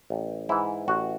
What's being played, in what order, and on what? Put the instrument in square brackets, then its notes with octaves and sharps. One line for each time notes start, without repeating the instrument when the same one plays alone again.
[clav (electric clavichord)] A1
G#2 E3 E4
A1 F#4